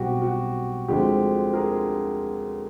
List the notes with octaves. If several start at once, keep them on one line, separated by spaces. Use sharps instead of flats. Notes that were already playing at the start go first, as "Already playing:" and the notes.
Already playing: B1 B2 G3 C4 F#4 G4
F#4
D2 D3 F3 G#3 C4 G4
G#4 A#4